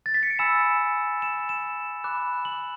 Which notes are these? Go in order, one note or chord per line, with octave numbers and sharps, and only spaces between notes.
A6
B6
C#7
D7
G#5 B5 E6 E7
E7
E7
B5 D6 F#6
F#7